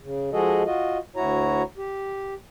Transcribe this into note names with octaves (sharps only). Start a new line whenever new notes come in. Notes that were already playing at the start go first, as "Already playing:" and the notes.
C#3
F3 G#3 F#4 G#4 A4 D#5
F4 F#4 D#5
D2 E4 F#4 C#5 A#5
G4